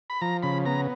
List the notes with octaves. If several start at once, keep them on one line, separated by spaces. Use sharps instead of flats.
B5
F3 A#5
C#3 B5
B3 A#5